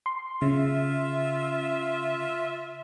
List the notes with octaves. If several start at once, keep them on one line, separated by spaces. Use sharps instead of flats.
C6
C#3 F4 E5